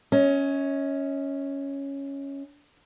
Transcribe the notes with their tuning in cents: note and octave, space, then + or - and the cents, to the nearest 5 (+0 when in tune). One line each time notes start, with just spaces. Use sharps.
C#4 +0 D#5 +40